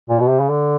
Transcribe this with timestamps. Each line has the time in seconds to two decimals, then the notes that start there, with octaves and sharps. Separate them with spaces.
0.10 A#2
0.20 B2
0.29 C3
0.40 C#3
0.49 D3